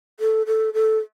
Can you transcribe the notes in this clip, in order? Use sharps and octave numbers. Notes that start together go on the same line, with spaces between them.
A4
A4
A4